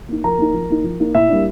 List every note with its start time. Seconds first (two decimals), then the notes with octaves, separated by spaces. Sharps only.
0.09 A#3 D#4
0.24 F3 A#4 A#5
0.39 A#3 D#4
0.54 F3
0.70 A#3 D#4
0.84 F3
1.00 A#3 D#4
1.15 A#2 E4 E5
1.30 G3 A#3 D4